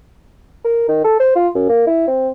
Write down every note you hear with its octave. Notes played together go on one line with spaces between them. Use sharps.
A#4
D#3
A4
C5
F4
F#2
A#3
E4
C4